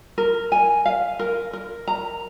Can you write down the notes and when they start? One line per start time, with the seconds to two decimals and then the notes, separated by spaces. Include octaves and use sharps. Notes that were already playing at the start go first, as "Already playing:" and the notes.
0.18 A#4
0.52 G#5
0.86 F5
1.19 A#4
1.53 A#4
1.88 A#5